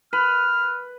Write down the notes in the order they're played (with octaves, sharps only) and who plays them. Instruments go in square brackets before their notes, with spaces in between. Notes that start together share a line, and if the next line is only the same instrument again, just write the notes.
[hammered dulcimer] B4 [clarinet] F6